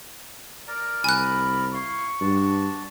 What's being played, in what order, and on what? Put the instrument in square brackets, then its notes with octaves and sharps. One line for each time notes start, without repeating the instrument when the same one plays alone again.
[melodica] A#4 D5 A#5
[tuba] C2 [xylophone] G#5 F#6 [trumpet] B5
[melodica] E4 F5 C6 [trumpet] C#6
[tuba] G2 [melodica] D4 F#4 A5